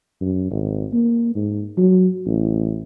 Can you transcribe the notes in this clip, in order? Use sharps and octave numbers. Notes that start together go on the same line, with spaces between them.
F#2
G#1
A#3
G#2
F#3
A1